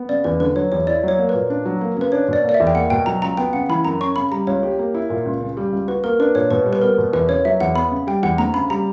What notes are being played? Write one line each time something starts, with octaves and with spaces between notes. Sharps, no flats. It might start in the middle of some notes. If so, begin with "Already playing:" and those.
Already playing: B3
C#3 D5
E2 B4
D3 B4
F#3 C#5
E2 C#5
E4 D5
F#3 C#5
A#3
A#2 B4
D4
F#3
A#3
C#3 B4
D4 C#5
B2 D5
A#3 D5
E5
E2
G5
A#3 F#5
B2 G5
F#3 A#5
C#2 A#5
B3 G5
C#3 F#5
E3 B5
F#2 A#5
C#4 C#6
C#3 B5
G3 A#5
C#2 C#5
G4
A#3
E4
A#2
C#2
C#3
G3
C#2
F#4 B4
A#3 A#4
D4 B4
A#2 C#5
B2 B4
G3
B4
B3 A#4
B2
E2 B4
C#3 C#5
F#3 E5
E2 F#5
B3 B5
C#3
G3 G5
E2 F#5
D2 A#5
C#3 B5
G3 A#5